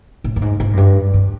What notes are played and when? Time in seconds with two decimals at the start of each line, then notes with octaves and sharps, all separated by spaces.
0.24 A2
0.36 G2
0.42 G#2
0.60 G#2
0.73 F#2
0.77 G2
1.14 G2